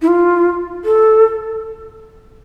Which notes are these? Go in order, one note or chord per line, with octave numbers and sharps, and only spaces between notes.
E4
F4
A4